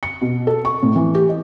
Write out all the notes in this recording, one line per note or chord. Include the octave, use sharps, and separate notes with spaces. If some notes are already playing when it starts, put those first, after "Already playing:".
C#7
B2
A4
C#6
A2
E3
G4
D#5